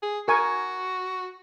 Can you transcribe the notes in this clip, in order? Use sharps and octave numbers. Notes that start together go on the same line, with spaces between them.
G#4
F#4 A#4 G#5 C#6